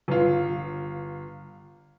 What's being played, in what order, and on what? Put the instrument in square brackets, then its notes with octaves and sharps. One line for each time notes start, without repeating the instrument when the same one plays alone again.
[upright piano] G1 F4